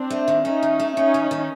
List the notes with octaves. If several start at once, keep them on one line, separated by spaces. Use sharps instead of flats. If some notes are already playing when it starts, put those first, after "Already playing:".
Already playing: C4 D4
A3
D#3
A3 C#4 D#4
D#3
A3
F#3 C#4 D#4
D#3
D#3